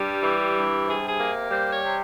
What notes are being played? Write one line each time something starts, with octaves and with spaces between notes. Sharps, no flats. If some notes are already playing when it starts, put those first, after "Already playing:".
Already playing: G2 G3 G4
E3
G2
C3 G#4
G#4
A#3
G3 C5
C#5
C3